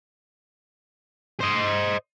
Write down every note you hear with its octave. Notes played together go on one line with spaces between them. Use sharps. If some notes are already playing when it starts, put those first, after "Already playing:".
C5 D#5